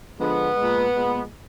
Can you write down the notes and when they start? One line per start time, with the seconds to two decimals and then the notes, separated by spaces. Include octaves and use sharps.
0.19 D3 F3 G#3 B3
0.56 A#2 G#3
0.94 A#2 G#3